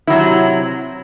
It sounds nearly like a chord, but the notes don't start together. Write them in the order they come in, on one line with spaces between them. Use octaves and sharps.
E4 F#3 C3